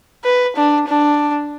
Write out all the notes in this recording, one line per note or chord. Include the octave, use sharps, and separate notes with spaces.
B4
D4
D4